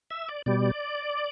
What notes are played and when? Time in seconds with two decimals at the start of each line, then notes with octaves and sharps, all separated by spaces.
0.11 E5
0.28 D5
0.46 B2 G3 D5